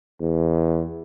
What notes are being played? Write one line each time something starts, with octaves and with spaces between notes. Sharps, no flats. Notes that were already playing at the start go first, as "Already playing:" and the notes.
E2